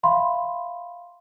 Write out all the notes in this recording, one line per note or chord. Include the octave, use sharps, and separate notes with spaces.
E5 F5 B5 C6